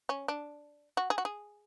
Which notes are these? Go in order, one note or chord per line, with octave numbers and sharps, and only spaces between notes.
C#4
D4
F#4
G#4
F#4
G#4